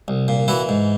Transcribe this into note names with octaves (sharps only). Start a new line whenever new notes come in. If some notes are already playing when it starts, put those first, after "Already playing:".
C2
A#2
E3 E4 F#4
G#2